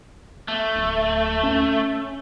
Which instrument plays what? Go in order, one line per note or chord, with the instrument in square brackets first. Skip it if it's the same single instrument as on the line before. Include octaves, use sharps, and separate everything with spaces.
[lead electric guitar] A3
[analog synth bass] D1
C#4